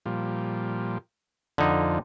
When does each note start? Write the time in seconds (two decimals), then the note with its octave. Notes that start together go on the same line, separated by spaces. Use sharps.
0.06 A#2 F3 G3
1.58 F2 D3 F3 D#4